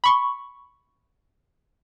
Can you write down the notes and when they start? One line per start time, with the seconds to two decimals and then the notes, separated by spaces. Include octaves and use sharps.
0.04 B5 C#6